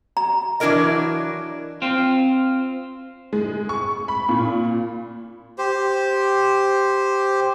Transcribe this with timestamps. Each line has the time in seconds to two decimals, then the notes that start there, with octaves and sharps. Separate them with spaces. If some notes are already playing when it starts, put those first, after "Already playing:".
0.17 A#5
0.60 E3 F#3 D4 E4 A#4 D#5
1.82 C4 F4
3.33 G#3
3.69 C#6
4.08 B5
4.29 A#2
5.58 G4 C5